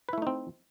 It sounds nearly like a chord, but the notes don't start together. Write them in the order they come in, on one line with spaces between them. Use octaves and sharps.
B4 E4 A3 D#4 C4